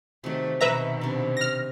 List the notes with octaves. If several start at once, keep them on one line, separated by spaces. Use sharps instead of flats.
C3 D#3 F#3 A3
B2 D#3 B4 E5 A#5
C3 D4
F6 A#6